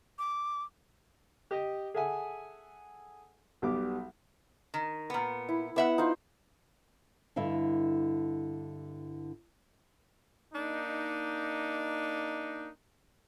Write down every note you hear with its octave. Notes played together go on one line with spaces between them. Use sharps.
D6
G4 D#5
G#4 A4 E5 F#5 G#5
B1 G3 B3 D6
D#3
A#2 B3
E4
B3 D4 E5 F#5
D#4 F4 C5
G2 D3 E4 D#5 F5
A#3 D4 D#4